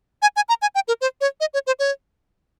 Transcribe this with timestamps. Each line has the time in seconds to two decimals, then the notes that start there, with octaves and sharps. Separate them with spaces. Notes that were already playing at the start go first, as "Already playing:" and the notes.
0.22 G#5
0.36 G#5
0.49 A#5
0.62 G#5
0.75 G5
0.88 A#4
1.01 C5
1.21 C#5
1.40 D#5
1.54 C#5
1.67 C5
1.79 C#5